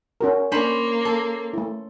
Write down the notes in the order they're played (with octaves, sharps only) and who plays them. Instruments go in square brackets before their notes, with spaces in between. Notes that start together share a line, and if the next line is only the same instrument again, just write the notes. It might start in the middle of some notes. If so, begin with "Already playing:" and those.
[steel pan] C#4 F#4 A#4
[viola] A#3 [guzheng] C#4 C5 B5 [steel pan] D4
[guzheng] A4
[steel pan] A3 E4